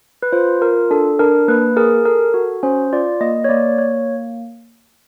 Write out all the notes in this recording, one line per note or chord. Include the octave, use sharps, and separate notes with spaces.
B4
F4 C5
F4 A#4
D4 A4
D4 A#4
A#3 B4
G#4 A#4
A4 A#4
F#4
C#4 C5
F4 D5
A#3 D#5
C#5
A#3 D5
A#3 C#5